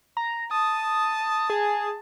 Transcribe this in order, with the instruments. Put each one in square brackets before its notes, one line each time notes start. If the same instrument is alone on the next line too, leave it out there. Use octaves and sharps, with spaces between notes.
[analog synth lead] A#5
[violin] A5 [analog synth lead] D#6
[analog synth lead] G#4